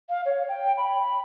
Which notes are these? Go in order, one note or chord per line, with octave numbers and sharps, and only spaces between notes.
F5
C#5
G5
B5